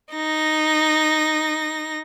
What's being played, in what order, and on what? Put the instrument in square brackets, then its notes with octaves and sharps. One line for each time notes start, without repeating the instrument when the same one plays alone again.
[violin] D#4 A#6